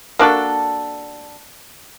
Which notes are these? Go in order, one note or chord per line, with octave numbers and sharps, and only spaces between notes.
A#3 D4 F#4 A4